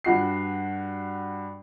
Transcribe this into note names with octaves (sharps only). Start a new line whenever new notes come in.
G2 F#4 C7